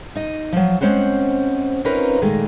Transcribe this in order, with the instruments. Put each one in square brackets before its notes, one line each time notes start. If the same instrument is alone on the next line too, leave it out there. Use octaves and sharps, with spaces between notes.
[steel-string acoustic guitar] D#4 D#5
F3 F#3
G#3 C4 C#4 C5 F#5
C4 C#4 D#4 F4 A#4 B4
A#2 D#3 G#3 A3